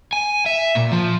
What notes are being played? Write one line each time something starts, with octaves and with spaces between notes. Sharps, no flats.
G#5
E5
A#2
F3